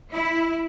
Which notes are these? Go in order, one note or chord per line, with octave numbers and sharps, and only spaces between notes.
E4